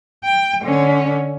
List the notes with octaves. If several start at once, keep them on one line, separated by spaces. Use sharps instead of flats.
G5
D3 C#4